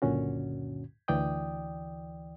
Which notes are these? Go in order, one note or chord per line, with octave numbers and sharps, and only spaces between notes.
C#2 F#2 A#2 D3 C#4 F#4
D2 E3 D5 G5 D#6